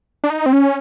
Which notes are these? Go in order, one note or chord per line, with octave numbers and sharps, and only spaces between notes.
D4
D#4
C4
C#4